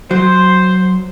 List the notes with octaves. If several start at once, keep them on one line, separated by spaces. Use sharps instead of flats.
F#3 C5